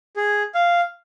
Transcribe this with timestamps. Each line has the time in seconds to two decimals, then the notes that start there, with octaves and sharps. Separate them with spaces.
0.16 G#4
0.54 F5